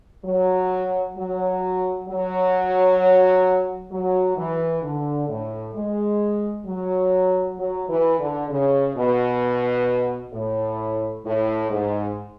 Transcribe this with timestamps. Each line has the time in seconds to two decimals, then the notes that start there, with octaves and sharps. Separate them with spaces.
0.25 F#3
1.17 F#3
2.08 F#3
3.92 F#3
4.37 E3
4.83 D3
5.29 A2
5.75 G#3
6.66 F#3
7.59 F#3
7.89 E3
8.20 D3
8.50 C#3
8.96 B2
10.33 A2
11.25 A2
11.71 G#2